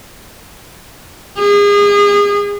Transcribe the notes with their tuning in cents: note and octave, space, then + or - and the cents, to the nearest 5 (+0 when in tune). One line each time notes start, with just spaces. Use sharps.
G#4 -30